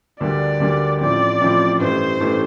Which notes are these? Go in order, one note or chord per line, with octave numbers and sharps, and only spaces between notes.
D2 D3 G3 A#3 D4 D5
D2 D3 G3 A#3 D4
A1 A2 F3 C4 D5
A1 A2 F3 C4
A1 G2 E3 A3 C5
A1 G2 E3 A3